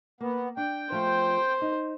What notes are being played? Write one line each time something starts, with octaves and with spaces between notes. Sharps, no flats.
A#3 B3
D4 G5
F3 A3 C5
D#4